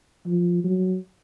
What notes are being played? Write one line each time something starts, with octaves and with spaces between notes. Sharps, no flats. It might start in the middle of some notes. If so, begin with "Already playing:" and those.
F3
F#3